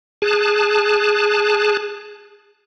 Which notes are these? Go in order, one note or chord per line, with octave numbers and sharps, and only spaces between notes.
G#4 A5 F#6